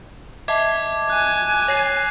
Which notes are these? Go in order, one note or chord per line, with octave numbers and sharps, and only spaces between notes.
D#5 E5 A5 D6 G#6
G#5 F#6
C#5 A#6 C7